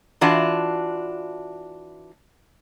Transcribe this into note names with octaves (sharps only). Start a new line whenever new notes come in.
E3 D4 F4 F#4